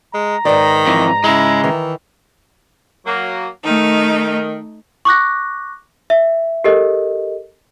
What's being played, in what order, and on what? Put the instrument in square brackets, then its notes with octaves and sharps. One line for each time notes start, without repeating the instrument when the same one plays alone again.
[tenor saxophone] G#3 [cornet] A#5
[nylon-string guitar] G#2 B4 D5 [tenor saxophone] D#3
[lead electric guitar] F2 E3
[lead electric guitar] C#3 G#3 [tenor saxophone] E4
[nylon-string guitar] D#3 E5 [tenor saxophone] E3
[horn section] F#3 A#3
[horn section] D#3 [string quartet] A3 D#4
[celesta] C#6 D6 F#6 A#6
E5
G4 A4 A#4 D#5